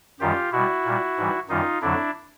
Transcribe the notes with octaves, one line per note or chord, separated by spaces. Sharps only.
F#2 D#3 G3 F4 G4
B2 G3 E4 F#4
A#2 G3
G#2 E3 G3
F#2 D#3 G3 D#4 F4
F2 D3 F#3 D4 E4